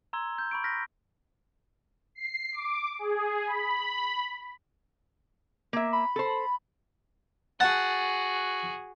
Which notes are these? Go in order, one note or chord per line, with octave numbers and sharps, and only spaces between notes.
A#5 C6 E6 G#6 G7
G6
B5 C#6 D7
F6 G6 A#6 B6
C7
D6
G#4
B5
A#3 E5
B5
A4 C5
F#4 G#4 F#5 A5